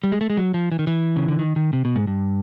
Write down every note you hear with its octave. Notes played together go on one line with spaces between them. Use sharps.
G3
G#3
A3
G#3
F#3
F3
E3
D#3
E3
C#3
D3
D#3
D#3
C3
B2
G#2
G2